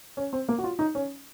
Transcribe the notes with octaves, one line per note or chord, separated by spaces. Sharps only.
C#4
C4
A#3
F#4
F4
D#4
C#4